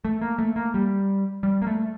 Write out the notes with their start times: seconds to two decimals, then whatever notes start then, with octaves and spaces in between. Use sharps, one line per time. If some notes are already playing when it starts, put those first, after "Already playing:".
0.05 A3
0.21 A#3
0.39 A3
0.56 A#3
0.74 G3
1.43 G3
1.62 A#3
1.67 A3